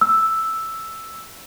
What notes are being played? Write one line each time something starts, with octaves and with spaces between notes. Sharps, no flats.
E6